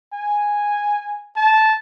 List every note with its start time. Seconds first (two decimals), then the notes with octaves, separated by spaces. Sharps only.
0.13 G#5
1.36 A5